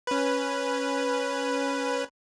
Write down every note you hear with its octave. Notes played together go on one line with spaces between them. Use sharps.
C#4 B4